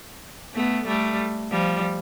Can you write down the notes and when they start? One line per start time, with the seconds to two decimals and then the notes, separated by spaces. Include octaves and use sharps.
0.55 A3 B3
0.87 G3 A3
1.51 F3 G3